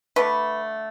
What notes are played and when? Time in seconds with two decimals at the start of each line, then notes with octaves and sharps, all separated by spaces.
0.16 D3 A3 B4